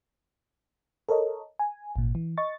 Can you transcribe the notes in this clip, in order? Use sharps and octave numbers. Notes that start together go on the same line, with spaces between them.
A4 A#4 C#5 D#5
G#5
G#1 A#2
E3
D#5 C#6 A6